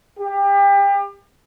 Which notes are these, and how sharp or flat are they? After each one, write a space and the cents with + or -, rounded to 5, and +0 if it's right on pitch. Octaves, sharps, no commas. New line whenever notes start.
G4 +30